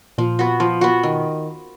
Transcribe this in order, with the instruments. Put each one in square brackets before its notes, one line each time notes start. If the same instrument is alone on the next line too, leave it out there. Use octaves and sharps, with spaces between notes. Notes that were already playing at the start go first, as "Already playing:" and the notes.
[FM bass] A#2 [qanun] F3
[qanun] B3 F#4
F3
B3 F#4
[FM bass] B2 [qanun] D#3